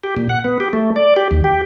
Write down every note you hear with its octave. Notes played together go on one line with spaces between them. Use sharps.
G4
A#2
F#5
B3
G4
A3
D5
G4
D#2
G4